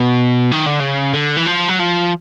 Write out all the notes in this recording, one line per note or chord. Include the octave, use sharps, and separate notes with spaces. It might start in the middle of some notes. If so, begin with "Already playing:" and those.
Already playing: B2
D#3
D3
C#3
D3
E3
F3
F#3
F3